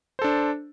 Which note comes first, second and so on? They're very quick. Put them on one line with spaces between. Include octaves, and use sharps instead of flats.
C5 A4 D4